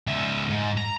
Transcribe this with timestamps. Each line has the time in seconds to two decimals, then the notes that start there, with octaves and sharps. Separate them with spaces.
0.07 C#2 E5
0.50 G#2
0.77 A#5